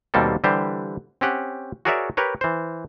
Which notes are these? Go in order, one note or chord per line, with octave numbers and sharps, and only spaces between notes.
D#2 B2 G3 A#3 C4 A4
D3 E3 G3 G4 C5
C4 C#4 G4 F#5
F#4 G#4 A#4 C#5 D5 E5
G4 A#4 B4 C#5
E3 C5